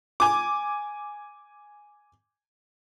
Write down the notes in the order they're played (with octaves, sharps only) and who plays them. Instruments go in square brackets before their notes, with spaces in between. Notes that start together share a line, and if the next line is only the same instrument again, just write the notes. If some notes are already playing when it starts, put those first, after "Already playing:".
[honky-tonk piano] G#5 D6